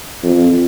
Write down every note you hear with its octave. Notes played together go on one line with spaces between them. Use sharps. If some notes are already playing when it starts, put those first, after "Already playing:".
F2